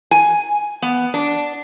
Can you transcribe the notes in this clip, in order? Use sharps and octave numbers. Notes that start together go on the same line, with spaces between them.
G#5
B3
D4